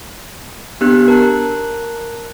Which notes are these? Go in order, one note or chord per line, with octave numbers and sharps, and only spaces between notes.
B3 D4 G4 F#6
A#4 A5 F#6